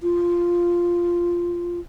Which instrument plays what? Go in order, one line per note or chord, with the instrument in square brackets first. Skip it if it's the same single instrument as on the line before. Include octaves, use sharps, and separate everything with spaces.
[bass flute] F4